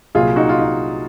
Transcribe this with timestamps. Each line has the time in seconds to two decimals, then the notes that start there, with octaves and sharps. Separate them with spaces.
0.15 C2 A#2 F#3 F4 G#4
0.36 D#4 F#4
0.49 F4
0.59 D#4